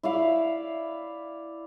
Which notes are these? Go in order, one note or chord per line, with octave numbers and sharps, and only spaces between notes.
E4 D5 E5 F5